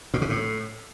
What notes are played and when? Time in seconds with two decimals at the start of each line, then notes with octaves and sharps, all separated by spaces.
0.14 A2
0.22 C3
0.30 A2